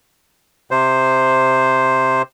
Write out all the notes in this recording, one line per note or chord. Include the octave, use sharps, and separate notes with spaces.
C3 C5